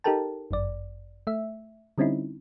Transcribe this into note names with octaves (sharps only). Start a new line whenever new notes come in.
D#4 G4 A4 A#4 G5 A5
G1 F#2 D5
A3 E5
D3 G3 C4 C#4 D#4 E4